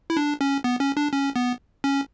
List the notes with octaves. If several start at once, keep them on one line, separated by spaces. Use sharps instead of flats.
E4
D4
C#4
B3
C#4
D4
C#4
B3
C#4